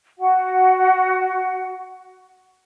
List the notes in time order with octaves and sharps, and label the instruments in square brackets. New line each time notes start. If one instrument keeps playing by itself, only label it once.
[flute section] F#4 F#5